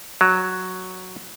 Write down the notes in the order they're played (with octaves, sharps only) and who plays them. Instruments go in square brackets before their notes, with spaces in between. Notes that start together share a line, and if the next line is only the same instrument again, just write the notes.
[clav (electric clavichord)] F#3